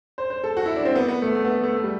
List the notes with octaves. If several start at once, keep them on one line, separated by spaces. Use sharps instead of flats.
C5
C5
A4
F#4
E4
D4
C4
B3
B3
A3
A3
B3
A3
A3
G3